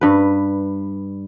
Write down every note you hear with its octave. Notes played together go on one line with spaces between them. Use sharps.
G2 B4